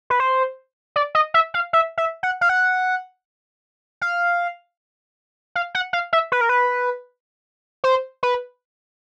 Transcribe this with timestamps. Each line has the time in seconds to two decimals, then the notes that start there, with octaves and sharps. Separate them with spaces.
0.10 B4
0.20 C5
0.96 D5
1.15 D#5
1.34 E5
1.54 F5
1.73 E5
1.98 E5
2.23 F#5
2.41 F5
2.49 F#5
4.02 F5
5.55 F5
5.75 F#5
5.93 F5
6.13 E5
6.32 B4
6.41 A#4
6.49 B4
7.84 C5
8.23 B4